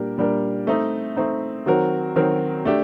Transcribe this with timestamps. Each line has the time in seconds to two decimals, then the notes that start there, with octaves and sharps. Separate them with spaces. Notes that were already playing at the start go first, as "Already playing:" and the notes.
Already playing: A#2 G3 D4 G4 A#4
0.18 A#2 G3 D4 G4 A#4
0.67 A3 C4 D#4
1.16 A3 C4 D#4
1.66 D#3 F#3 C4 F#4 A#4
2.16 D#3 F#3 C4 F#4 A#4
2.65 A3 D4 G4